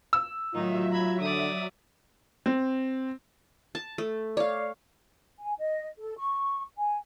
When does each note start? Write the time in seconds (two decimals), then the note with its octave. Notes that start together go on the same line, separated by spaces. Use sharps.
0.13 E6
0.54 A2 D#3 F#3 D#4 F4 E5
0.91 A#5 B5 G#6
1.20 D3 D5 D#6
2.46 C4
3.75 A5
3.98 A3
4.37 C#5 D5 F5
5.39 G#5
5.59 D#5
5.99 A4
6.18 C#6
6.77 G#5